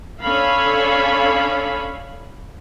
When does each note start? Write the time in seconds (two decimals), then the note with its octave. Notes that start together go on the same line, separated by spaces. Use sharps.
0.21 C#4 D4 A4 C#5 F5 B5